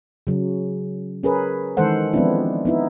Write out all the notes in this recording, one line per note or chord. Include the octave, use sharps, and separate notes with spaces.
C#3 F#3
C#4 G#4 A#4 B4
D#3 E3 G#3 A4 C5 F#5
F3 G#3 B3 C4 D4 E4
B3 D#4 E4